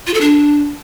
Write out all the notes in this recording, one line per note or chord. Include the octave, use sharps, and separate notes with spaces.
F4
A4
D4